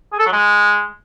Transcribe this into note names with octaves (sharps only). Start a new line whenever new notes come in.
G#4
A4
F#3
G#3